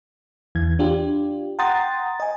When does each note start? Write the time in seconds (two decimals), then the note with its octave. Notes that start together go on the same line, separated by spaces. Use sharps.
0.55 E2 E3 G#6
0.79 D4 F4 G4
1.59 F#5 G5 A#5 C6 D#6 A6
2.20 D#5 G#5